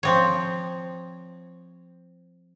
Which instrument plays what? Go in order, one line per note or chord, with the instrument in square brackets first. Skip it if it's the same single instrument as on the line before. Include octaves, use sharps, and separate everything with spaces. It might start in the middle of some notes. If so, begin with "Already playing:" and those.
[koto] F3 C4 C#5